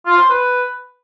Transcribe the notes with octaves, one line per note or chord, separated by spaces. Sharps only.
F4
C5
B4